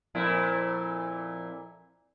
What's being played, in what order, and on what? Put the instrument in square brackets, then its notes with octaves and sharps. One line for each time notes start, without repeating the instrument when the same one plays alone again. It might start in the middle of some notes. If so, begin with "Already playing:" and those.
[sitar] F2 A#2 E4